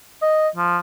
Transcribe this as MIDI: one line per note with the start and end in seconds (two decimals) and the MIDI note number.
0.22 0.49 75
0.56 0.79 53